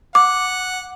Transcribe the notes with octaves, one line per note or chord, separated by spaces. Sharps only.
F#5 D6